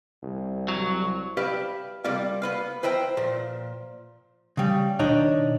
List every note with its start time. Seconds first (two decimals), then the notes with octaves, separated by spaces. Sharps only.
0.23 C2
0.68 F#3
1.37 G4 B4 D5 E5 F5
2.04 C3 G3 A#3 D5 F5
2.42 B3 B4 F5
2.83 B4 C5 E5 G5 A#5
3.17 A#2 F3
4.57 C#3 G3
4.99 B2 D#3 D4 D#4 C#5